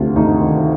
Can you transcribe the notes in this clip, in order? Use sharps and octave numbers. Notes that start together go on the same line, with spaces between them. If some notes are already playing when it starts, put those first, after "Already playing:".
Already playing: D2 C3 F4
D2 D#4
D#3